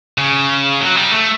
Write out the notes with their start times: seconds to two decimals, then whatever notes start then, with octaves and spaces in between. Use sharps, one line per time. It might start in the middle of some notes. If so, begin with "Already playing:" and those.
0.18 C#3
0.80 F#3
0.96 G3
1.12 A3